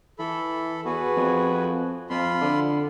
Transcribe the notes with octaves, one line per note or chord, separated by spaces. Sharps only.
E3 A4 B5
E2 F#4 G#4 B4
F2
F2 F4 B5 C6
D3